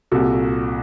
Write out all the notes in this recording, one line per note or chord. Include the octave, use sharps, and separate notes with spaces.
C2 A#2 F#4 A4